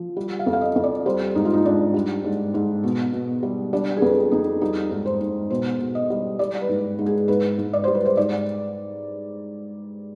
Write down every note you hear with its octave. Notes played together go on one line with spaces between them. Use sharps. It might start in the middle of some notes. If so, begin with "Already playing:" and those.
Already playing: F3
G3
F5
F2
F5
D#5
F2
D5
G3 C5
G#2 D#4
F4
D#4
G#2 D4
G3
G#2
G#2
B2
B2
G3
G3 D4
G#4
F2 B4
F2 D#4
G3 D#4
G#2
C5
G#2
B2 C5
B2
D#5
G3
G3 D5
B4
G#2
G#2
G#4
G#2 B4
G#2
D5
G3 C5
B4
C5
G#2 D5